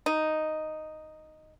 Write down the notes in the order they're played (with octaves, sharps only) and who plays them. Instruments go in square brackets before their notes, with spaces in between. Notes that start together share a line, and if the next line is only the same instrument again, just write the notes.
[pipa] D#4